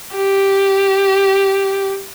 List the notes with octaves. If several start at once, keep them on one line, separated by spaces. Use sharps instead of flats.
G4